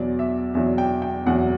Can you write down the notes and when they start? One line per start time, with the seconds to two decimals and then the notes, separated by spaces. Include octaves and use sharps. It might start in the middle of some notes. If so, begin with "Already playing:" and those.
Already playing: E2 B2 F#3 D5
0.19 E5
0.54 E2 B2 F#3 E5
0.78 G5
1.02 G5
1.26 E2 B2 F#3 F#5